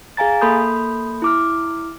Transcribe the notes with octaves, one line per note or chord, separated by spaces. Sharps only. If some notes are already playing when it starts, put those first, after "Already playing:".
G#4 F5 G#5 A#5 A6
A#3 A4 B5 C6 D#6 G6
E4 D6 F6